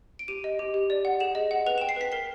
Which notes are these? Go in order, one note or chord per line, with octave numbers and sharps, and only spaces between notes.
D7
G4 D#7
D#5
G4
G4
D5
F#5
G#4 E7
D#5
F#5
B4 F7
G5 E7
C7
B4 B6
A#4 C7